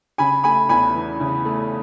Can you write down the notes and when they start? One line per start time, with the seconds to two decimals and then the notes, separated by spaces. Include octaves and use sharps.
0.18 C#3 G#5 B5
0.44 A3 G#5 B5
0.69 E2 G#5 B5
0.95 E3
1.20 C#3
1.45 A3